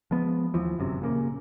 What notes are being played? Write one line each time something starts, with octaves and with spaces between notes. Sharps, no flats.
F3 G#3 B3
D#2 E3 F3
G1 F#2 C3
A#2 C#3 A#3